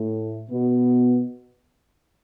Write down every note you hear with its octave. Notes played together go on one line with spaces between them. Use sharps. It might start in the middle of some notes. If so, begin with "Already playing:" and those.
Already playing: A2 A3
B2 B3